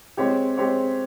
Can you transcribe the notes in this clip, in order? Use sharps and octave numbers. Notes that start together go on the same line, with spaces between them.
G#3 C4 G4 C#5
G#3 C4 G4 C#5